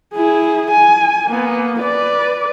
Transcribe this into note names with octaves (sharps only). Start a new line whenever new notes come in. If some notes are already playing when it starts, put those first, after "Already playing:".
E4 G#4
G#5
A#3 B3
B4 D5